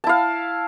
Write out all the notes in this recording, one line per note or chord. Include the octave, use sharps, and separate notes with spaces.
E4 F5 A5